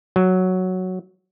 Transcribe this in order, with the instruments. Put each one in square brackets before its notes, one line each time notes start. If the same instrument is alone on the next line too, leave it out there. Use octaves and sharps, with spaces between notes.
[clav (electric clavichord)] F#3